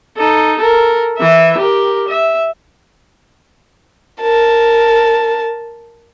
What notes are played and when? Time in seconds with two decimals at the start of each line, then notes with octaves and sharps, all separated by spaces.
0.17 D#4 A4
0.58 A4 A#4
1.18 E3 E5
1.58 G4 A#4
2.08 E5
4.21 A#4 A5